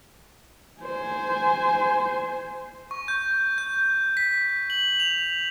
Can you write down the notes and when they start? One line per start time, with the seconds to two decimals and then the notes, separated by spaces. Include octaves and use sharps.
0.82 C5 G#5
2.91 C#6
3.08 G6
3.58 G6
4.17 B6
4.70 F#7
5.00 F7